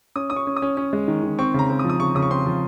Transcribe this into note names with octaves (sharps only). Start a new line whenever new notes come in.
C#4 D#6
C#4 D#6
C#6
C#4
D#6
C#4
C#4
G#3
D#3
D#3
C4 C#6
C#3 A#5
C4
D#6
F3
D#6
C#3 C#6
C#3 D#6
C#6
C4 C6
F3